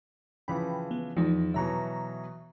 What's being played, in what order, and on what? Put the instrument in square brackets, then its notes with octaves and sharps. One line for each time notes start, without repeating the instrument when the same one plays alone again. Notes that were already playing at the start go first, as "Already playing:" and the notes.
[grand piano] C#3 E3 F3 [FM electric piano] G5 B5
[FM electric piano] B3
[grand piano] E2 [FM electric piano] F3 D#4
[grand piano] B2 E3 F#3 [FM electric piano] E5 A#5 C#6